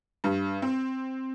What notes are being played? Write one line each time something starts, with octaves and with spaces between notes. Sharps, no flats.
G2
C4